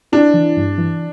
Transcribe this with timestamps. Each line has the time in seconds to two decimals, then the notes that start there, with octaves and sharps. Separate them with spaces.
0.12 D4 E4
0.34 E3
0.57 G2
0.78 E3